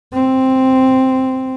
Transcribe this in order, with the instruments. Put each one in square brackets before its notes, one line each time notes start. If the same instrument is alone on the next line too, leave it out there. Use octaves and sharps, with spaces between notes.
[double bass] C4